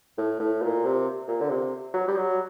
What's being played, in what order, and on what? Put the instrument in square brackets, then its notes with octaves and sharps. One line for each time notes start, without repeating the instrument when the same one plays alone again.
[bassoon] A2
A2
A#2
C3
A#2
D3
C3
F#3
G3
F#3